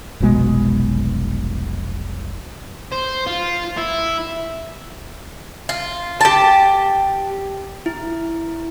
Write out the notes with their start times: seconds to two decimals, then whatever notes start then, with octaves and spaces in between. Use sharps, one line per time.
0.20 F1 B1 B2 G#3
2.92 C5
3.27 F4
3.78 E4
5.69 F4
6.21 G4 A5
7.86 E4